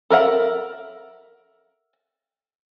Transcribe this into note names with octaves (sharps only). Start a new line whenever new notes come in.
A4 A#4 E5 F#5